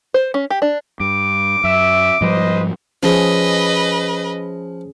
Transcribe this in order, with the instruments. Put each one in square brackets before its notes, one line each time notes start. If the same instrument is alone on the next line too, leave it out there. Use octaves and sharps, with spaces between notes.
[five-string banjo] C5
C#4
G4
D4
[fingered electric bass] G2 [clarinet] D6
[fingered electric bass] F#2 [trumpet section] E5
[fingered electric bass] G#2 F3 G3 [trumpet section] B4 C5 D#5
[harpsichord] F3 [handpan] C#4 G#4 [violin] B4 D#5